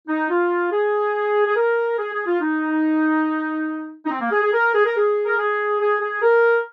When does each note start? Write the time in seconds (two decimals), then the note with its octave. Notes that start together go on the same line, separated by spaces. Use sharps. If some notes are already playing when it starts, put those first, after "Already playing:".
0.08 D#4
0.30 F4
0.72 G#4
1.47 G#4
1.56 A#4
1.99 G#4
2.13 G#4
2.27 F4
2.41 D#4
4.06 D#4
4.11 C4
4.21 A#3
4.32 G#4
4.42 G#4
4.53 A#4
4.74 G#4
4.86 A#4
4.97 G#4
5.26 A#4
5.38 G#4
5.81 G#4
6.01 G#4
6.22 A#4